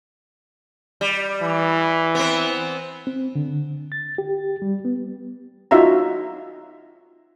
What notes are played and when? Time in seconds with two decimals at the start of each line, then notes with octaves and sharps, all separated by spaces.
1.01 G3
1.42 E3
2.15 B3 C4
3.07 C4
3.35 D3
3.92 A6
4.18 G4
4.62 G3
4.85 B3
5.71 D#4 F4 F#4 E5 F5 A#5